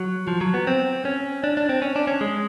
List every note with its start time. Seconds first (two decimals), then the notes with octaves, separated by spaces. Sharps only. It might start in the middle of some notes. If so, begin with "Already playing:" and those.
Already playing: F#3
0.28 F3
0.41 F#3
0.54 B3
0.67 C4
1.05 C#4
1.44 D4
1.57 D4
1.69 C4
1.82 C#4
1.96 D4
2.07 C#4
2.21 G#3